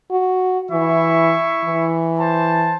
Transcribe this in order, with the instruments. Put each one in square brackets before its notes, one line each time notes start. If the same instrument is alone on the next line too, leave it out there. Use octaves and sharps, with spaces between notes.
[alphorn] F#4
[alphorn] E3 [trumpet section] E4 E5 C#6
[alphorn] E3
[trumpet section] C5 A5